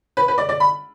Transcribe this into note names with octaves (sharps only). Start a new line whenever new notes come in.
B4
B4
D5
D5
B5